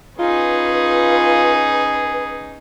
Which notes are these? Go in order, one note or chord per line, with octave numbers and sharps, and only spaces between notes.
C#4 D#4 F4 G#4 B4